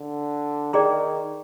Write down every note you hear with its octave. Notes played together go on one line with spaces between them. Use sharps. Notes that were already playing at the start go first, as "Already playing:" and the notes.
Already playing: D3
D#3 G#4 D5 G5 A#5